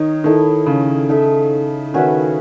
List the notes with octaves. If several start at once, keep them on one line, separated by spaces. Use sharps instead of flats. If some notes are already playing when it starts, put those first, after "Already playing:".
Already playing: D#3 D#4 C#5
D#3 E4 A4 D#5
C#3
D#4 A4 E5
D#3 C#4 F#4 B4 E5